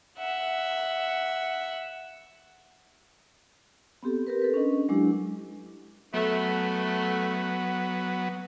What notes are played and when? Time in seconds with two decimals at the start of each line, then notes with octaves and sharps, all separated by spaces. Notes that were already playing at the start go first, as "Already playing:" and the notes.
0.18 E5 F#5
4.03 B3 C4 G4 A4
4.27 G4 A#4 B4
4.42 A4 B4
4.54 C#4 D4 D#5
4.89 F#3 G#3 D4 E4 G4
6.13 F#3 A3 B3